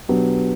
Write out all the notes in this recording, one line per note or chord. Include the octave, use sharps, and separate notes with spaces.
B2 F#3 B3 D4 G4